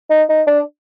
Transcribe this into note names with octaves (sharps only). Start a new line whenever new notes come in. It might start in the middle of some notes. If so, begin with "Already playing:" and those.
D#4
D#4
D4